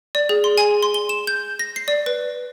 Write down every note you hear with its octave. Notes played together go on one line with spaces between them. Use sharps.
D5
G#4
C6
G#5
C6
G7
E7
G6
A#6
C7
D5
B4